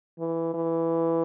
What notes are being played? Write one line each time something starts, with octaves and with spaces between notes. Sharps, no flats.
E3
E3